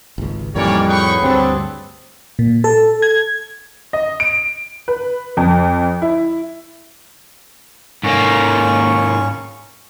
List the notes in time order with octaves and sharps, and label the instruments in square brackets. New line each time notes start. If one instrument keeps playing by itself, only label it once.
[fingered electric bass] G#1 C#2
[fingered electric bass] F2 A2 [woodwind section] D#3 E3 A#3 [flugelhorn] G3 [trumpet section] C#5 D5
[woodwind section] F#3 G#4 B4 [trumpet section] A#4 G5 C#6
[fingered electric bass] D2 G2 [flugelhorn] C4 [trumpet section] D4 A4
[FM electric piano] A#2
A4
G#6
[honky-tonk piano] D#5
D7
B4
F2
E4
[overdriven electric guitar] G#2 A#3 [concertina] C#4 C#6